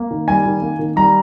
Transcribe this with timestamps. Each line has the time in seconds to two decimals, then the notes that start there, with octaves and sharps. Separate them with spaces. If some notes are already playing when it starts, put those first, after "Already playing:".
Already playing: A#3
0.11 D#3
0.28 G3 G#5
0.46 D#3
0.62 A#3
0.79 D#3
0.96 G3 A#5